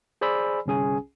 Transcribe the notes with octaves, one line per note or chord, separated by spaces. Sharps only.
G#4 C5 D5 G#5 B5 E6
G1 C2 C#4 G#4 G#5